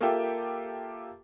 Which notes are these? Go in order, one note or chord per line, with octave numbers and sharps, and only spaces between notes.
A#3 F4 G4 A4 E5 G5